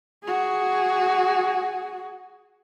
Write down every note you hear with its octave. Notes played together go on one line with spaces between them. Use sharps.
F#4 G#4